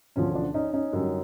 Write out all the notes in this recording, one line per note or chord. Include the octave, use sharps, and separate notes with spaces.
E1 D2 D3 F3 C#4
D4
C#4 D#4
C#4 D#4
F#2 D3 G3